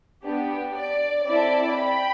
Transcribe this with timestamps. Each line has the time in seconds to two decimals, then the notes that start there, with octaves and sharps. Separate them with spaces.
0.23 B3 D4 G4
0.75 D5
1.27 C4 E4 A4 D5
1.78 G5 B5